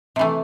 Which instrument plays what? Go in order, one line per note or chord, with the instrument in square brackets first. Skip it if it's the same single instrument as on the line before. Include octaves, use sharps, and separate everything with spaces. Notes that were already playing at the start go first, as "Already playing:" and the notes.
[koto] C3 E3 A3